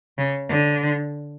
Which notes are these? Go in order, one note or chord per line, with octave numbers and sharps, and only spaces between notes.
C#3
D3